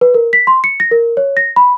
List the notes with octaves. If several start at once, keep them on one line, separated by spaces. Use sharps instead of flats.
B4
A#4
B6
C6
C#7
A#6
A#4
C#5
A#6
B5